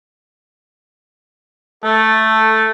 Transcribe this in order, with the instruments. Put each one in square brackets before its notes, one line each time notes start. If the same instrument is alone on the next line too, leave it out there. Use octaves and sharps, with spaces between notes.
[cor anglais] A3 [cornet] A4